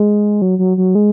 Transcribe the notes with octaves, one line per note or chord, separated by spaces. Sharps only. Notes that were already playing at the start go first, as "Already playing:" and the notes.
Already playing: G#3
F#3
F#3
F#3
G#3